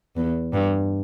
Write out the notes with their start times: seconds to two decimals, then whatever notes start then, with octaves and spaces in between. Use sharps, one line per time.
0.16 E2
0.53 G2